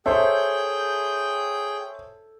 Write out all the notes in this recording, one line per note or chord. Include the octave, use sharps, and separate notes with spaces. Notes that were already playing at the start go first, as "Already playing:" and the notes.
G#4 A4 C5 C#5 E5 G5 G6